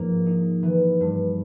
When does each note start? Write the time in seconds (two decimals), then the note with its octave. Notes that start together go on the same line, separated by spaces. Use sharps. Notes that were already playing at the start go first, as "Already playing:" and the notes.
Already playing: G#2 F3 A#3
0.26 D#4
0.63 E3
1.01 G2